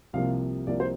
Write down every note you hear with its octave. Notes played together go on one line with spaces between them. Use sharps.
C2 C3 F3 A#3 F5
C2 C3 F3 A#3 D5
C5